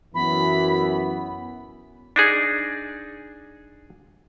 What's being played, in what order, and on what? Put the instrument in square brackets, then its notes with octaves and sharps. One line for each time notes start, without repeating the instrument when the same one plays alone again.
[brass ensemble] F#2 E3 [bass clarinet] B3 [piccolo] B5
[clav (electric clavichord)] D4 D#4 G#4